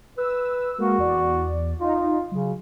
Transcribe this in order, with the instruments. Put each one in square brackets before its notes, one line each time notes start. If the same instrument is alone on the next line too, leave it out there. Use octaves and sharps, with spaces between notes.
[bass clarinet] B4 [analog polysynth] E6
[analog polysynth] G#3 A#3 A#4 [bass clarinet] F#4
[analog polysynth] E2 D5
[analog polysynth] D#4 [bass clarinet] F4
[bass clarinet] C#3 [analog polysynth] F#3